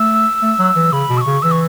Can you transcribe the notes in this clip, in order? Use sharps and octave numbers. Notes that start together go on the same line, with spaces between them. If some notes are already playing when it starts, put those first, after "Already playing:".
Already playing: A3 E6
A3
F#3
E3
C#3 B5
B2
E6
C#6
C#3
E3 E6
C#6